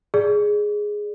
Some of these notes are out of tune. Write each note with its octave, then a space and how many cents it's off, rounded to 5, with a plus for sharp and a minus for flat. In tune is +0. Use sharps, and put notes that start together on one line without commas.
G#4 +0 D5 +0